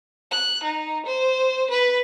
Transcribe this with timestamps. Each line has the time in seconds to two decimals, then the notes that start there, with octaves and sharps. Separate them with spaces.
0.31 F#6
0.63 D#4
1.06 C5
1.71 B4